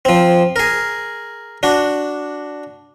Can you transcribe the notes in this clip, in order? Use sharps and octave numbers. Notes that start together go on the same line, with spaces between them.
F3 C4
G#4 A#4
D4 F#4